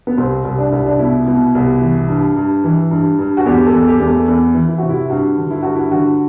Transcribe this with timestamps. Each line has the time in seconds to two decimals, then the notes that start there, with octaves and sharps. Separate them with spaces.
0.07 B3
0.18 C2 C4
0.44 C2
0.58 D4
0.72 C2 E4
0.86 D4
0.99 B2 E4
1.26 B2
1.55 C2
1.81 E3
2.08 G2
2.36 G2
2.64 E3
2.91 G2
3.19 G2
3.37 F#4
3.46 E2 G4
3.66 A4
3.73 E2
3.87 G4
4.00 E2
4.07 A3
4.28 E2
4.54 E3
4.69 E4
4.78 C3 F#4
4.89 E4
5.10 G2 F#4
5.37 D3
5.50 E4
5.63 G2 F#4
5.75 E4
5.91 D3 F#4